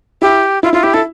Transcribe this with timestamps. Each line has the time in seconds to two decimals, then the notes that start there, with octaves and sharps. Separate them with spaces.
0.22 E4 G4
0.63 E4 F4
0.73 E4 F4
0.83 E4 G4
0.94 E4 A4